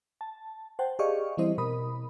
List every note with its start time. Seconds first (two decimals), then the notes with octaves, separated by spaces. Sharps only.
0.21 A5
0.79 C5 F#5 G5 A5
0.99 G4 G#4 D5 D#5 F5 C#6
1.37 E3 G3 C4 E4 C5 D#5
1.58 B2 A#4 B5 D#6